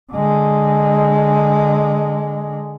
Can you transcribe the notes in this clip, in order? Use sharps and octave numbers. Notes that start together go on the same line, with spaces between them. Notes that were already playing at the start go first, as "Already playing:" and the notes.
D3 G#3